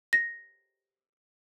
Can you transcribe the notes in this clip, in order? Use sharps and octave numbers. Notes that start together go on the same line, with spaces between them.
A#6